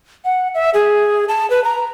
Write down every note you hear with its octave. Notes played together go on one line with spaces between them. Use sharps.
F#5
E5
G#4
A5
B4
A#5